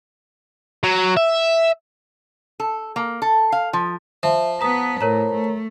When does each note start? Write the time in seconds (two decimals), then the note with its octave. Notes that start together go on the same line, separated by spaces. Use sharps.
0.84 F#3
1.17 E5
2.60 A4
2.96 A#3
3.22 A4
3.52 F5
3.73 F3
4.23 F3 E5
4.61 B3 B4 A#5 D#6
5.01 A2 A#4 C#5 A#5
5.35 A3